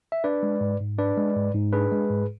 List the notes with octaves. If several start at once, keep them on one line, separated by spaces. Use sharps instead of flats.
E5
D4 B4 D5
G#3
G#2
G#2
D4 B4 D5
G#3
G#2
G#2
D4 G#4 B4
G#3
G#2